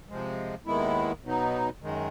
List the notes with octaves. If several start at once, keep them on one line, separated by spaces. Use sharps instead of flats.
C3 F3 G#3
D#2 D#3 G#3 B3 E4
B2 F#3 B3 D#4
F#2 D#3 G#3